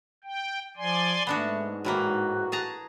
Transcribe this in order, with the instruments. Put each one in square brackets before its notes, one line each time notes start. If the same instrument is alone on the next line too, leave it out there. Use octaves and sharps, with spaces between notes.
[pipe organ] G5
[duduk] F3 [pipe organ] D5 G#5 C6
[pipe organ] G#2 [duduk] A3 [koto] B3 D4 F#4
[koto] A2 E3 A#3 [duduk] F#4
[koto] G#4 A5 A#5